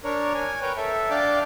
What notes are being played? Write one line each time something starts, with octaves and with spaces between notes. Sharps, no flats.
D4 A#4 C#5
G#5
A#4 B4 C#5 G5
A4 E5
D4 D5 F5 G5 A5